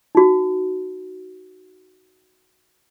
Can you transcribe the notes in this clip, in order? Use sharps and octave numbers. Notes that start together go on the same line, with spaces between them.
D#4 F#4